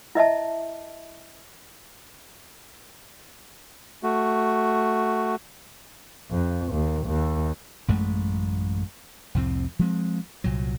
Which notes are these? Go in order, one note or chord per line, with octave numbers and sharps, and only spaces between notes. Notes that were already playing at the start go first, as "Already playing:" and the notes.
E4 D#5 E5 A5
A3 F#4
F2
D#2
D#2
A1 F#2 G#3 A3
C2 F2 A2 C4
F3 G#3 C4
C2 A#2 F#3